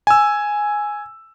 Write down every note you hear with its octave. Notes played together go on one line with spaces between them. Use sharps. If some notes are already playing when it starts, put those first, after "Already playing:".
G#5 E6